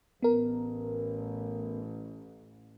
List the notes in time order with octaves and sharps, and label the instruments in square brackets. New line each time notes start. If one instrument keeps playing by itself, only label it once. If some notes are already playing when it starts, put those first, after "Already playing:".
[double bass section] A1 [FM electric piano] B3 A#4